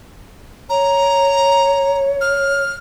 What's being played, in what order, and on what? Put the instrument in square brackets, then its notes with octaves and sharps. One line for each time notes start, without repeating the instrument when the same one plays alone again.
[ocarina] C#5 [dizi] A#5
[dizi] F6